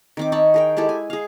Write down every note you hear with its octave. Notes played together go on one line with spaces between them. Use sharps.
D#3 C4 D6
D#4 C#5 A5 B5
G#4 A#4 G5
G#3 E4 G4 A4
G#5
G#4 F5